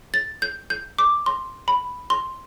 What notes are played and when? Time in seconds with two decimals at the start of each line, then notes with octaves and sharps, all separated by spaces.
0.14 A6
0.42 G6
0.70 G6
0.99 D6
1.26 C6
1.68 B5
2.10 C6